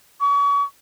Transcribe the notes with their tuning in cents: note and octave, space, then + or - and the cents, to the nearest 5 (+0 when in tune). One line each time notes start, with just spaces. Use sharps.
C#6 +35